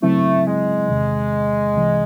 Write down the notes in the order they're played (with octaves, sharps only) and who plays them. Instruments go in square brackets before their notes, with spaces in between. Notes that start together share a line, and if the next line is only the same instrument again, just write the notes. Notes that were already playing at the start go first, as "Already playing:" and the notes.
[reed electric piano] C#3 F#3 C4 E4 [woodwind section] A3
[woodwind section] G#3
[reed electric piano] E2 C3 D#3
C2 C3 E3